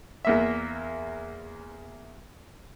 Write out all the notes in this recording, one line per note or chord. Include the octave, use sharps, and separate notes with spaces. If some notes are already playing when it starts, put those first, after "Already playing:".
E2 A#3 E5